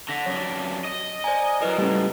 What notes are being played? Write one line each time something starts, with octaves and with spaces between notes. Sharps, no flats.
D3 A#6 B6
F#2 D4 C#5
D#5
C5 D5 G#5 A#5
F#3 E4 A#4 B4 D#5
C#2 A2 G3 A3 C#4